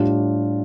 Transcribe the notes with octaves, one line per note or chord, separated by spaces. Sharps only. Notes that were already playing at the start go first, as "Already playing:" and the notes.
Already playing: A2 G3 D4 F4